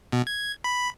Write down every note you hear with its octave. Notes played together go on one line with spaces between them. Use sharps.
B2
G#6
B5